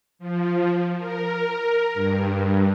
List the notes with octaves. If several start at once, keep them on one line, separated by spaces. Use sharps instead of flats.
F3
A#4
G2